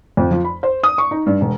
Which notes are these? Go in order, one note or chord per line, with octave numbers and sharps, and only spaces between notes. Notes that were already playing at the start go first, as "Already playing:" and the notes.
F2
F3
B5
C5
D#6
C#6
D#4
G2
E1